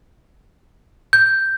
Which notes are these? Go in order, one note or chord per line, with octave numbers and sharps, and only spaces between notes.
G6